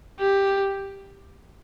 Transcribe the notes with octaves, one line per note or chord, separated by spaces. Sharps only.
G4